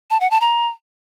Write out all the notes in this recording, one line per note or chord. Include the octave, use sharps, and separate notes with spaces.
A5
F#5
A5
A#5